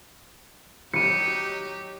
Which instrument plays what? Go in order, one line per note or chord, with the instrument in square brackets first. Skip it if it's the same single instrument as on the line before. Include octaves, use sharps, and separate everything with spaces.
[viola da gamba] F#3 D#4 G4 [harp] C#7 D#7